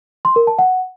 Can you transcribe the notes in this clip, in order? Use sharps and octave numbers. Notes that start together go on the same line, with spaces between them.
C6
A#4
A5
F#5